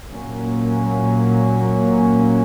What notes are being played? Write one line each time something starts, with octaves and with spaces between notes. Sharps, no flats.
A#2 F#3 A#3 C#4